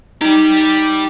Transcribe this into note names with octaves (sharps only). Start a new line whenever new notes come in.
D#4 G4 D5